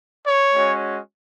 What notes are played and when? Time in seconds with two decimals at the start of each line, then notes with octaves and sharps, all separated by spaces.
0.23 C#5
0.55 G#3 C#4 F#4